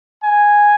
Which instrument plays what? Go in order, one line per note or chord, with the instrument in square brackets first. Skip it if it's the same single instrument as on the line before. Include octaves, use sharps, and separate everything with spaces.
[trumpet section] G#5